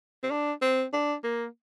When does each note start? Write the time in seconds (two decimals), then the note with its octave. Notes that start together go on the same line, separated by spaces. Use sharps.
0.23 C4
0.31 D4
0.62 C4
0.93 D4
1.24 A#3